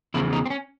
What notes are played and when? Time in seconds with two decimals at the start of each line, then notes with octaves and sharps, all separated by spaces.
0.14 E2 C#3 F3 E4
0.33 D#4
0.46 C4
0.50 C#4